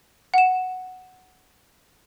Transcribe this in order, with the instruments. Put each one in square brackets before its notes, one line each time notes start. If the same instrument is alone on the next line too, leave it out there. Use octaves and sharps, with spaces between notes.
[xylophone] F#5 E7